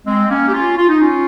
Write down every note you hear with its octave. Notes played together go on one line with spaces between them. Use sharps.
G#3 C4
A#3 C#4
G4
C#4 F4
F4
D#4
C#4 F4